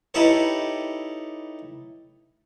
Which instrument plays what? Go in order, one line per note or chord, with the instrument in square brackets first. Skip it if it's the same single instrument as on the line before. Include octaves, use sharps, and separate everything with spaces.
[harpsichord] D#4 E4 G4 A4 B4 C#5